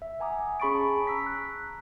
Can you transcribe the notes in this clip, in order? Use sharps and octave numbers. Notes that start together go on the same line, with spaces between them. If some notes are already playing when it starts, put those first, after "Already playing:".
E5
F#5 G#5 A#5 D6 D#6
C#4 G#4 B5 C#6 A6 D7
A5
A#5 E6 B6
F#6